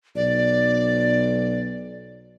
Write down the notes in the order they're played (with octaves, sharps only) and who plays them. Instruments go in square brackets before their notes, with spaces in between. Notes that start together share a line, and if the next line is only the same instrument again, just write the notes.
[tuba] B1 [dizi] D5